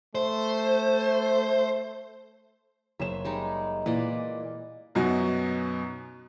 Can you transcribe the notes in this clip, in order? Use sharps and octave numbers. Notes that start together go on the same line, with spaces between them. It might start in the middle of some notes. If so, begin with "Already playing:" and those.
A3 C5
F#1 C5 C#5 E5 E7
G3 G#3 D#4
A#2 E3 B4 D5 D#5
F#2 B2 F#3 B3 D#4 F#4